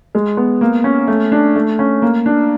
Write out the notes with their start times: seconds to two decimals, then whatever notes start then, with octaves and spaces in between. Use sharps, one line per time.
0.15 G#3
0.37 B3
0.61 A#3
0.84 C#4
1.08 A3
1.32 D4
1.56 A3
1.79 C#4
2.02 A#3
2.26 D4